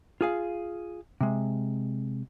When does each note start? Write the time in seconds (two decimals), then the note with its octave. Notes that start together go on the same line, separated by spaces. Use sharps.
0.21 F4 G#4 F5
1.21 C3 G#3